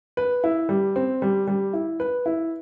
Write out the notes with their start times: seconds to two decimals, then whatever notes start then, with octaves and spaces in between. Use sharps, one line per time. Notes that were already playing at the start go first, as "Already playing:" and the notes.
0.17 B4
0.44 E4
0.69 G3
0.96 C4
1.22 G3
1.47 G3
1.73 E4
2.00 B4
2.26 E4